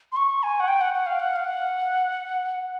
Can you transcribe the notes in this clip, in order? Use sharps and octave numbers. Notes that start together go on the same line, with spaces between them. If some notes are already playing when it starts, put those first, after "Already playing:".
C6
C#6
G#5
F#5
G5
F#5
F#5
F5
F#5
F5
F#5